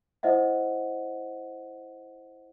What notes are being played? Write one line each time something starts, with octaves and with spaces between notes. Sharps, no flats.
E4 C5 D#5 E5 F#5